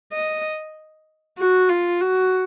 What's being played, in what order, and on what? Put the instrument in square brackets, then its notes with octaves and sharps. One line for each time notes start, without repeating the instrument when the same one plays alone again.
[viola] D#5
F#4
F4
F#4